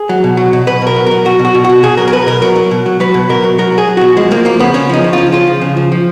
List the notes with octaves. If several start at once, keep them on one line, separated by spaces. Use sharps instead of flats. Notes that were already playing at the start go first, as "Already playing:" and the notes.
Already playing: G#4
F#3
B2
F#3
B2
B2 B4
B2 A#4
F#3
F#3 A#4
B2 F#4
B2
F#4
B2
B2 F#4
B2 G#4
F#3 A#4
A#4
B2 B4
B2 A#4
F#3 A#4
F#3
B2
F#3
F#3 B4
B2
B2 A#4
F#3
F#3 A#4
F#3
G#4
F#3
B2 F#4
F3 G#3
F3 A#3
F3 A#3
C#3 B3
C#3 C#4
F3 D#4
C#3
F3 F4
C#3 F4
F3
C#3
F3
F3